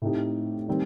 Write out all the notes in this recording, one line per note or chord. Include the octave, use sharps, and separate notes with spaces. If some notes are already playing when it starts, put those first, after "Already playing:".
A2 A3 C4 D#4 G4
D#3 G3 C4